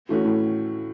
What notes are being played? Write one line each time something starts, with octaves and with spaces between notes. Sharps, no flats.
E3 A3 C#4 F#4
A2